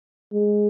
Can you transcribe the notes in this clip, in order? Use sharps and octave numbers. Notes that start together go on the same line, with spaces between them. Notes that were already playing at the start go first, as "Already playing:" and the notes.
G#3